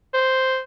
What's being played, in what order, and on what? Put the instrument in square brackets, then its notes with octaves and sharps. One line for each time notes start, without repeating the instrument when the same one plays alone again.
[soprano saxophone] C5